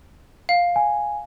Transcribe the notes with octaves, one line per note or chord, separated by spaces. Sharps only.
F5
G#5